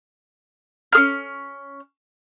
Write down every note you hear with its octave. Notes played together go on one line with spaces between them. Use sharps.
C#4 G#4 F6